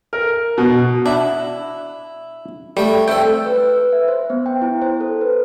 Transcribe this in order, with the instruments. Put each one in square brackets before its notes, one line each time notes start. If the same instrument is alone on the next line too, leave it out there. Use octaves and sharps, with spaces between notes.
[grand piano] A#4
B2
[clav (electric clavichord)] D4 E5 F#5 [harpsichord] E4
[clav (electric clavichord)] G3 [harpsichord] A3 G5
[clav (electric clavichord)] A3 G5 [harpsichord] C4 A4
[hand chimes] E6
B4
B4
E5
C5
B3
G5
E4
C5
A4
B4